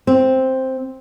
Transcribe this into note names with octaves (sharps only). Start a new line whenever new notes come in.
C4